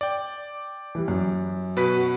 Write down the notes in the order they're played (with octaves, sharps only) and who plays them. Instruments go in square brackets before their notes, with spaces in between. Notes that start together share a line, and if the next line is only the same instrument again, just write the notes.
[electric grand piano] D5 G5
[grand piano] E3 G3
F#2
[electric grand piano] B2 B4 B6 [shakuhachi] F#4